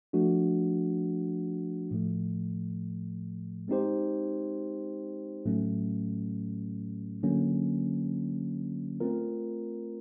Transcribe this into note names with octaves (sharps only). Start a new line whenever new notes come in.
F3 A3 D4 F#4
A2 F3 A3
G#3 C4 D#4 G4 C5
A2 F#3 A3 C#4
D3 F#3 A#3 C#4
A3 C4 F4 A#4